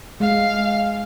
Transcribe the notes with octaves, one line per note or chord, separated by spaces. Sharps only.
G#3 F5